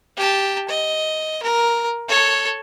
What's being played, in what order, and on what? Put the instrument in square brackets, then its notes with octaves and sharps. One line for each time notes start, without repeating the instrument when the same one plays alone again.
[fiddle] G4 A5
D#5
A#4
A4 C#5